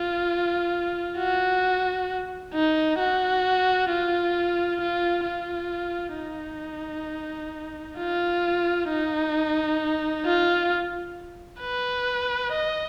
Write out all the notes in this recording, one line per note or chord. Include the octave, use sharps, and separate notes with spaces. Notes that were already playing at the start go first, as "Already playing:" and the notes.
Already playing: F4
F#4
D#4
F#4
F4
F4
F4
D#4
F4
D#4
F4
B4
D#5